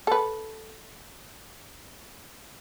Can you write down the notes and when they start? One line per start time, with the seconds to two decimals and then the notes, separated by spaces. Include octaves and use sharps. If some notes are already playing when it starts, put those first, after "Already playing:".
0.07 A4 B4